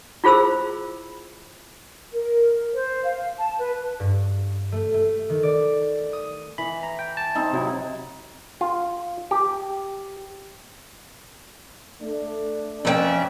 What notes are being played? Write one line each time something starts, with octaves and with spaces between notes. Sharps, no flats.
E4 F4 G#4 C5 B5 E6
A#4
C5
F5
A5
B4
G2
A3
A3
D#3
D5
D#6
E3 B5
A#5
G5
A5
C4 D#4
C3 F#3 E4
F4
G4
A3 D4
F2 C#4 A4 D5 E5 G5